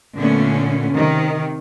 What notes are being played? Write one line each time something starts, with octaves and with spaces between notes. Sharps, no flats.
A#2 D3 A3 B3 C#4
C3 D#3